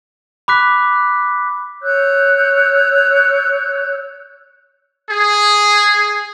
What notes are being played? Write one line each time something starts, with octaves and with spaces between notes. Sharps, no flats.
B5 D6 F#6 B6
C#5 E6 F#6 G6
G#4